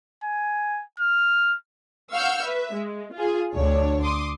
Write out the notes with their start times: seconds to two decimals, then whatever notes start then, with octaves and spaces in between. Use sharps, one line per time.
0.24 G#5
1.00 F6
2.13 F5 F#5 C#6 E6 F6 G6
2.44 B4 E5
2.73 G#3
3.14 F4 G#4
3.54 D2 D4 C#5
4.03 C6 D6 D#6